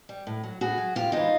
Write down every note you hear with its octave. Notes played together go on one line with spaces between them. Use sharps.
G3
A2
F#3
A2 F#4 G#4
F#3
A2 F4 G4
E3 G#3 D#4 F4